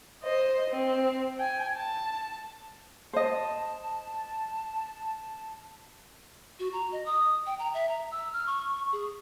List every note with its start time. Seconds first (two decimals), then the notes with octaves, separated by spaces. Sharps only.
0.24 C5 D#5
0.71 C4
1.38 G5 G#5
1.77 A5
3.13 C5 D#5 A5
6.60 F#4
6.73 A#5
6.92 D#5
7.06 D#6
7.46 G5
7.59 A#5
7.74 E5
7.88 A#5
8.11 E6
8.33 F6
8.47 C#6
8.92 G#4